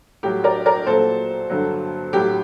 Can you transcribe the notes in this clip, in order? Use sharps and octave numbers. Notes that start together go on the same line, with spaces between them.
A2 F#3 G4
A#4 D5
A#4 D5
A#2 F#3 A4 C5
G2 D3 F#3
A2 F#3 G4